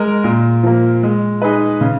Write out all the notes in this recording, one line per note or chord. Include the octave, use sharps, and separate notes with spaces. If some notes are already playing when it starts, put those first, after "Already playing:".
Already playing: G#3 A#4
A#2
F3 A#3
G#3
D#4 G#4 B4
C#3